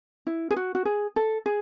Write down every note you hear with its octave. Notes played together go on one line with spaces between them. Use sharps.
E4
G#4
F#4
F#4
G#4
A4
G#4